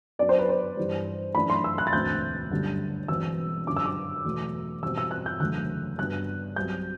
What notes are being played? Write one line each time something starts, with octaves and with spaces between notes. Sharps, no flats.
F#2 F#3 B3 D4 D5
C5
B4
C5
G2 E3 G3
F#2 E3 A3 D4 B5
C6
E6
F#6
A6
E1 D2 D3 A3 C4 G6
G1 F#2 D3 G3
E1 E2 B2 F#3 C4 E6
F#2 D3 G3 D4 D6
E6
D6
E2 B2 F#3 A3
E2 B2 G3 C4 E6
E6
F#6
G6
F#1 E2 D3 F#3 A3 F#6
G2 F#3 B3 D4 F#6
B1 B2 G3 C4 G6